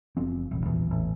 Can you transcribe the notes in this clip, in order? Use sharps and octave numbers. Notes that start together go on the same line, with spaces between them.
F#1 F3 C4
E1 A1
A#1 E2
A1